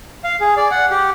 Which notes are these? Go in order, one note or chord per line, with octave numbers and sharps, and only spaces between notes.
F5
G#4
D5
F#5
G4